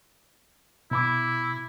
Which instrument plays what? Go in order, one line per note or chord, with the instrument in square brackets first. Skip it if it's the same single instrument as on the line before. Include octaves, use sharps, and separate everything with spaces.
[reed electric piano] B2 B5 D6 [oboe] E4